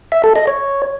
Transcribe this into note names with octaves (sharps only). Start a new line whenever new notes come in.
E5
A4
D#5
C#5